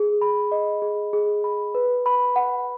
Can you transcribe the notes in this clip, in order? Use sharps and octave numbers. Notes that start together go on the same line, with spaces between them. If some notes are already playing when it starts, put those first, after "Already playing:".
Already playing: G#4
B5
D#5
G#4
G#4
B5
B4
B5
F#5